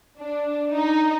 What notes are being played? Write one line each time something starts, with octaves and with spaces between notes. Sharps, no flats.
D4
D#4